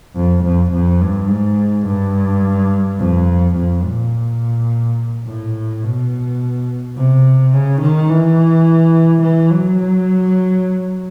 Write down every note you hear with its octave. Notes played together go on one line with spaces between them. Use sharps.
F2
F2
F2
G2
G#2
G2
F2
F2
A#2
A2
B2
C3
C#3
D#3
E3
E3
F#3